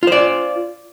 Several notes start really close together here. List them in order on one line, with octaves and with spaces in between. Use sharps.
F4 C5 D5